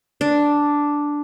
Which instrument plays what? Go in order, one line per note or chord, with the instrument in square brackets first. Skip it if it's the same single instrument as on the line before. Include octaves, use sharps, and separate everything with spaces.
[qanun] D4